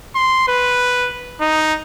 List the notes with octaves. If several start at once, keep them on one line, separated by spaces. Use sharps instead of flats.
C6
B4
D#4